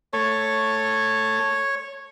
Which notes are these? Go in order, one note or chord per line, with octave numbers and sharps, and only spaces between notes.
A3 A4 C#5 C#6